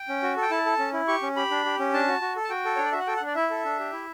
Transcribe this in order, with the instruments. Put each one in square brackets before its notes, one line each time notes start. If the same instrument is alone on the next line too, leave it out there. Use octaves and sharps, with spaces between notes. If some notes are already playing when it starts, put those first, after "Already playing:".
Already playing: [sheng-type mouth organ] G5
C#4
F#4
A4
G5
E4 A5
A4
C#4
E4
G4 C#6
C#4
G4 B5
D4
G4
C#4
D4 A5
F#4
F#4
A4
A5
F#4 G5
A4
D4 C#5
D5
F#4 E5
F#5
A4 G5
F#5
D4 D5
E4 E5
A4
D4
G4
E4